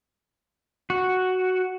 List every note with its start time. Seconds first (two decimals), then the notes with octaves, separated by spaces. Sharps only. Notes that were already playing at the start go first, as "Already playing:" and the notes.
0.90 F#4